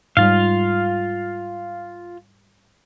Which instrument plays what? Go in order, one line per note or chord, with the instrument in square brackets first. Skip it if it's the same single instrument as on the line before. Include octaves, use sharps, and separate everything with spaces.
[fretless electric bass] G#2 G3 [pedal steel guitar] F4 F5